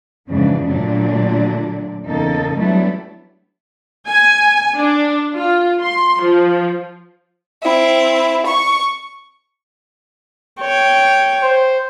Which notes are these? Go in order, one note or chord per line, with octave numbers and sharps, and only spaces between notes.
F2 G#2 C#3 E3 D4
A#2 D3 F#3 A3 D4
E2 C#3 A#3 D#4 A4
F#3 G3 A3 B3 D4 E4
G#5
D4
F4
C6
F3
C4 E4
C#6
C#5 G5
C5